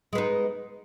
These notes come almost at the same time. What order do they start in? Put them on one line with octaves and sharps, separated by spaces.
G#3 B3 D#4